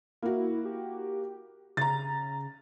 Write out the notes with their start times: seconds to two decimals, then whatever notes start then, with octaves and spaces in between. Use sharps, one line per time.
0.22 A#3 E4 F#4
0.65 G4
1.77 C#3 A#5 A6